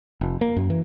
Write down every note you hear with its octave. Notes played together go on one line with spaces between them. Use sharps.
F1
A#3
F#2
E3